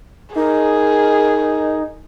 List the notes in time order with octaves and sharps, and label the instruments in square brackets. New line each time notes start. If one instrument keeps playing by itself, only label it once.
[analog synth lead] D#4 [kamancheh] G#4 [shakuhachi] A#4